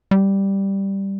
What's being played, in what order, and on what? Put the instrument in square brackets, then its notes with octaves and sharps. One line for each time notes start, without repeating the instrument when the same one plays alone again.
[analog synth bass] G3